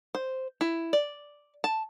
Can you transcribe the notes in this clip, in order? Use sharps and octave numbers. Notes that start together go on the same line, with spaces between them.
C5
E4
D5
A5